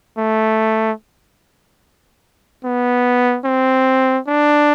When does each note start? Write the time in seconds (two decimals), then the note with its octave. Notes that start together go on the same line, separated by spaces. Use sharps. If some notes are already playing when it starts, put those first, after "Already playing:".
0.18 A3
2.64 B3
3.45 C4
4.28 D4